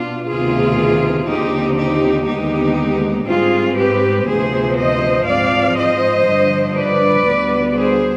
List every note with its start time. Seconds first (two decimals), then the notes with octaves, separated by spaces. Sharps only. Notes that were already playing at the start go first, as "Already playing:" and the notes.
Already playing: B2 B3 D4 F4
0.29 D2 C3 D#3 B3 F4 G#4
1.29 D#2 D3 F3 C4 D#4 G4
1.79 D#4 G4
2.28 D#2 D3 G#3 B3 D#4 G4
3.28 G#2 G3 C4 F4 G#4
3.78 G4 B4
4.27 D2 C3 F3 B3 G#4 C5
4.78 C5 D#5
5.27 G#2 F3 C4 D5 F5
5.77 C5 D#5
6.27 G2 D3 F3
6.77 B4 D5
7.26 D2 D3 G3 B3
7.76 G#4 C5